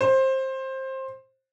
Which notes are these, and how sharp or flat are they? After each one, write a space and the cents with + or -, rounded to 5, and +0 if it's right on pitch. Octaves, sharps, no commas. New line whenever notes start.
C5 +20